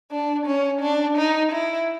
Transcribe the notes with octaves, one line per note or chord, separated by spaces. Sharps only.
D4
C#4
D4
D#4
E4